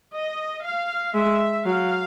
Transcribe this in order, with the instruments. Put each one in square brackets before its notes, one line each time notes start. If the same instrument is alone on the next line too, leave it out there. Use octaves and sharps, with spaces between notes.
[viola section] D#5
F5
[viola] G#3 [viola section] E5
[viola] F#3 [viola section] F5